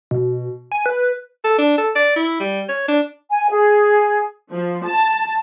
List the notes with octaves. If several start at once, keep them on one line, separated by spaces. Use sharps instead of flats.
B2
G#5
B4
A4
D4
A4
D5
E4
G3
C#5
D4
G#5
G#4
F3
A5